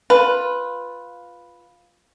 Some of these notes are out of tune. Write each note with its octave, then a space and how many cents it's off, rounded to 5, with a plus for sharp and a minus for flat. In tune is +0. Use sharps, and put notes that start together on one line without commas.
F4 +10 B4 +0